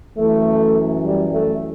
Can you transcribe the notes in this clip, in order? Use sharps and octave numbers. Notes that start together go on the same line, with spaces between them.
F#2 E3 A3
G3
A3